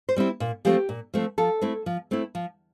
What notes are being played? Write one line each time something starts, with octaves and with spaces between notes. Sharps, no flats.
C5
G3 C4 E4
A#2
F3 A3 C4 G4
A#2
F3 A3 C4
F3 A4
A3 C4 E4
F3
A3 C4 E4
F3